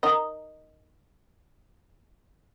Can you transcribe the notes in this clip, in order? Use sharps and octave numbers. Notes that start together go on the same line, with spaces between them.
D#4 A#4 D#5